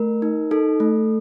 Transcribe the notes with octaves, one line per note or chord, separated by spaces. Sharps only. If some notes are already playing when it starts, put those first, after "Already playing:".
Already playing: A3 A#4
D#4
D#4 A4
A3